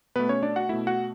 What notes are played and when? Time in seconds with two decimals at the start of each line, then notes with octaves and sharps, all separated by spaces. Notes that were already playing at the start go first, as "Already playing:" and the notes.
0.16 B2 A3 B3 B4
0.29 C#4 C#5
0.42 D4 D5
0.56 F#4 F#5
0.69 B2 A3 E4 E5
0.87 F#4 F#5